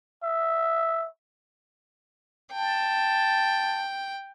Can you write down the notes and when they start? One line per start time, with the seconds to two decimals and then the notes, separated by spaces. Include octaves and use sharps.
0.23 E5
2.53 G5 A5